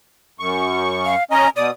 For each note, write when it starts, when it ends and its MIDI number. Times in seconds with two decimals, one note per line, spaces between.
0.39 1.15 42
0.39 1.15 85
1.05 1.24 77
1.31 1.47 61
1.31 1.47 75
1.31 1.49 82
1.56 1.71 47
1.56 1.68 74
1.56 1.71 87